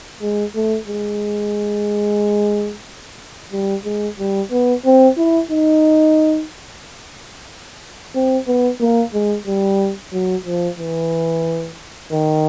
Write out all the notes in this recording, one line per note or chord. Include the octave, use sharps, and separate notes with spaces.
G#3
A3
G#3
G3
G#3
G3
B3
C4
E4
D#4
C4
B3
A#3
G#3
G3
F#3
F3
E3
D#3